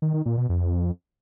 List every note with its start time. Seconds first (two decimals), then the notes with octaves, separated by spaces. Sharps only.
0.02 D#3
0.14 D#3
0.26 A#2
0.37 B2
0.49 F2